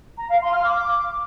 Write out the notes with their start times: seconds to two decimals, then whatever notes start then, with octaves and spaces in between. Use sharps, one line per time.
0.19 A#5
0.30 F5
0.41 C6
0.53 F6
0.64 D6